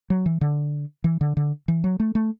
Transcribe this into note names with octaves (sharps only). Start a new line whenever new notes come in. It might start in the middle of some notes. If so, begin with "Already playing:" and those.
F#3
E3
D3
E3
D3
D3
E3
F#3
A3
A3